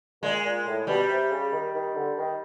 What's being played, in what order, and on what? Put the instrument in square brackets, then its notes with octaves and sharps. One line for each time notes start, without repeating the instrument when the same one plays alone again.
[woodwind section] A#2 [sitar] G#3
[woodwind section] A#2
A2
[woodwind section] B2 [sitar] G3
[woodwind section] C3
C#3
D#3
D#3
D3
D#3